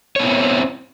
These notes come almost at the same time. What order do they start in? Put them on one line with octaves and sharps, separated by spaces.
C#5 B3 E4 C4